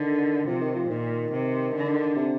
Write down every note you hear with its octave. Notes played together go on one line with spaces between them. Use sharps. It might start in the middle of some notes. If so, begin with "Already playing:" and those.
Already playing: D3 D#3
C3 F3
D#3
F3
A#2 D#3
C3
D3
C3